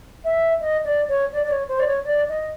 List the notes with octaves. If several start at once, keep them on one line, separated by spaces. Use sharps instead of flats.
E5
D#5
D5
C#5
D5
D5
C#5
C5
D5
C#5
D5
D#5